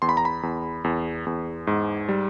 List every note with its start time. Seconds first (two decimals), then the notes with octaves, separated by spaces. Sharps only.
0.02 E2 C6
0.09 B5
0.17 A#5
0.25 B5
0.43 E2
0.84 E2
1.26 E2
1.67 G#2
2.09 G3